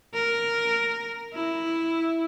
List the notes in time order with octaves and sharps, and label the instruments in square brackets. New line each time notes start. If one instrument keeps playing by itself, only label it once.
[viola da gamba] A#4
E4